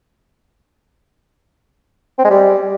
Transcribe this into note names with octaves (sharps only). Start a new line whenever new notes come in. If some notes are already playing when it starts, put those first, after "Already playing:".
C4
G#3
G3